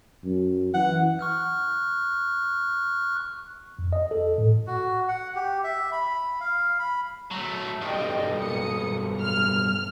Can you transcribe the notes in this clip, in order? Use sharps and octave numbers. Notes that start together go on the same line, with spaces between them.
F#2
E3 F#5
C#6 F6 F#6
F2
D#5
A4
A2
F#4
F#5
G4
E5
B5
F5
B5
F#3 A3
B1 G2 D5 D#5 G5
A#3 D#6 C#7
F6